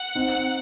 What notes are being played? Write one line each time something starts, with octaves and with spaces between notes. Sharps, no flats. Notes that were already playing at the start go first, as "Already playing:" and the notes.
Already playing: F#5
C4 D#4